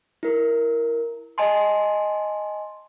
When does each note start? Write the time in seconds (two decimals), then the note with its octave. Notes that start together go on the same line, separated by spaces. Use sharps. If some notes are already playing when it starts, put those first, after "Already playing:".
0.23 E4 A#4
1.38 D#5 G#5 A5 C6